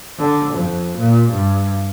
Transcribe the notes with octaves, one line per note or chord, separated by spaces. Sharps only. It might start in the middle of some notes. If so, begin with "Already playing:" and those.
D3
F2
A#2
G2